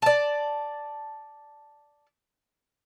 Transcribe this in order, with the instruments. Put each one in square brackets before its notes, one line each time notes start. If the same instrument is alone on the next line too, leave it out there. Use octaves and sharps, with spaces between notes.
[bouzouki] D5 A5